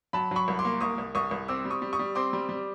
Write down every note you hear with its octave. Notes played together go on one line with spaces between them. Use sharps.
F#3 A5 B5
F#3 B5 C#6
C2
C6 D6
A#3
C2 C#6 D#6
C2
C2 C#6 D#6
C2
C4 D6 E6
G3
C#6 D#6
G3
C#6 D#6
G3
C4 C6 D6
G3
G3